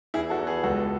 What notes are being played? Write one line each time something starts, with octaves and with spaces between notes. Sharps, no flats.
E2 E4 G#4
F#4 A4
E2
G#4 B4
C#2 F#4 A4